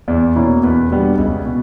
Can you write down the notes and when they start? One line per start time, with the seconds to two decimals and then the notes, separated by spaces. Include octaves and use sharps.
0.08 E2 D5
0.35 B2 A#3 C#4 E4
0.63 E2 B4
0.90 B2 G3 B3 D4
1.18 C#2
1.46 B2